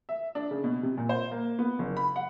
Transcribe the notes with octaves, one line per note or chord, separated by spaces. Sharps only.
E5
D4
C#3
B2
C3
A#2
C5
A#3
B3
F#1
B5
F#5